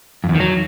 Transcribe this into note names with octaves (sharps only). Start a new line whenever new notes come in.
F2
E2
D#3
F#3